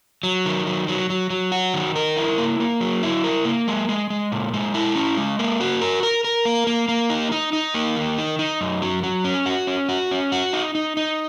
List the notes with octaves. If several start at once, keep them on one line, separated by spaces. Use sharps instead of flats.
F#3
D#3
F#3
F#3
F#3
F#3
F#4
D#3
A#4
E4
A#3
A#3
F#3
E4
A#4
A#3
G#3
G#3
G#3
A#2
G#3
E4
C#4
G#3
A#3
F#4
A#4
A#4
A#4
A#3
A#3
A#3
D#4
D#4
D#4
A#3
D#3
D#4
D#4
F#2
F#3
F#3
C#4
F#4
C#4
F#4
C#4
F#4
D#4
D#4
D#4